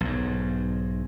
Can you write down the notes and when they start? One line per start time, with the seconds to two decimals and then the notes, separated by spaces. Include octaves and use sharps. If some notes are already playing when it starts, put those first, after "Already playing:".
0.01 B1 G#2